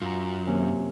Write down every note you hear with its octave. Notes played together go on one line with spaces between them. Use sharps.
F#2 F4 A#5
C3 D#3 F#3 A#3 C#4